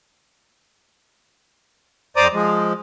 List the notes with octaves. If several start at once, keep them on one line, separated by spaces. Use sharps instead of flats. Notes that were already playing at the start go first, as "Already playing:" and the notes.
F2 C5 D5 A#5 D6 D#6
F3 G#3